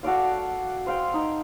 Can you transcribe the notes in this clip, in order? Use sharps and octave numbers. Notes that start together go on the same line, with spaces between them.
F#4 A4 D5 F5
C5 F5 G5
D#4